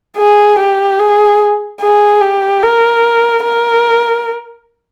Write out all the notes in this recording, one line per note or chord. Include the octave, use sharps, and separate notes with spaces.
G#4
G4
G#4
G#4
G4
A#4
A#4